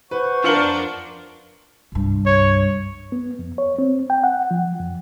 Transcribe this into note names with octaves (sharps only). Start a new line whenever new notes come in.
B4 C5 F#5 C#6
F2 D4 F4 A#4 F6 C#7 F#7
C2 G2
C#5
B3
F2
C#5
C4
G5
F#5
F3
F2